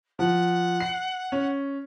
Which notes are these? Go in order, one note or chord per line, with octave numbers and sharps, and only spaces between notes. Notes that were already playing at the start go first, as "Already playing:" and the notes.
F3 F#5
C7
C#4